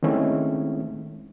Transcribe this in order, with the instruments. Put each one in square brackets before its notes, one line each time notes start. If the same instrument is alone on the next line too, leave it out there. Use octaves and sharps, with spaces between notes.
[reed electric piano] D#3 G#3 A3 C4 C#4 E4